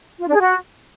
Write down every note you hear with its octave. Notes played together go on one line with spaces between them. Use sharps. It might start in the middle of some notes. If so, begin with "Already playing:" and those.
F4
D4
G#4
F#4